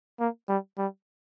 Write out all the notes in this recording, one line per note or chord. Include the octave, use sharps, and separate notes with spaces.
A#3
G3
G3